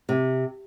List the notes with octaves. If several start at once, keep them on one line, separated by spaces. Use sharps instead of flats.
C3